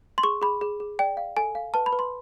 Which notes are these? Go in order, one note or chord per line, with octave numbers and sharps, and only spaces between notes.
C6
G#4 C#6
G#4 B5
G#4
G#4
D5 G5
F5
A4 G#5
F5
B4 A5
B5
B4
C6